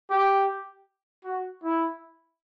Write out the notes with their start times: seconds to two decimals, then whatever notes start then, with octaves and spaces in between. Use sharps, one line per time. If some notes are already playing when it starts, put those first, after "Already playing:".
0.10 G4
1.25 F#4
1.63 E4